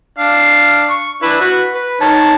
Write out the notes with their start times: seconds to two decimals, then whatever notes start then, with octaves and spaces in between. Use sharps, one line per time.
0.18 D4 F5
0.90 C#6
1.22 D4 E4 B4
1.41 F#4 B4
1.74 B4
2.01 D#3 C#5 A5